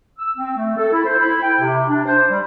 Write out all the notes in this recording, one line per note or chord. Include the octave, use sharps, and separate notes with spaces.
E6
C4
A3
A4
E4
C5
E4
G5
C3
D4
C5
G3